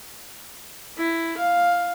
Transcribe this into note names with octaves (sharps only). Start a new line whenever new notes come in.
E4
F5